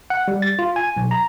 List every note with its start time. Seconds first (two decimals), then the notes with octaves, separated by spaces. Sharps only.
0.10 F#5
0.28 G3
0.42 A6
0.59 F4
0.76 G#5
0.96 B1
1.11 A#5